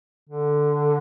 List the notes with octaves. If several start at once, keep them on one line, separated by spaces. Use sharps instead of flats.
D3